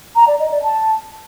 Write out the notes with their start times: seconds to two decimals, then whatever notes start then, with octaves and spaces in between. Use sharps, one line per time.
0.16 A#5
0.28 D5
0.39 D#5
0.51 D5
0.63 A5